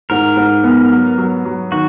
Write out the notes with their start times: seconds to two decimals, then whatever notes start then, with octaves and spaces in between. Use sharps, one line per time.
0.10 G#2 A#4
0.37 G#2
0.64 B3
0.92 F#3
1.18 F#3
1.45 F#3
1.72 D#3 F#4